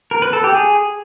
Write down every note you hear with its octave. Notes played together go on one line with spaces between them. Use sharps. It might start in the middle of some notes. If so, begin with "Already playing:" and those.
A#4
B4
A4
G4
G#4